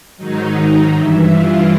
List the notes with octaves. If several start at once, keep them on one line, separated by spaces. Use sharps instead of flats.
G#2 D#3 F#3 D#4
G2 E3 E4
F4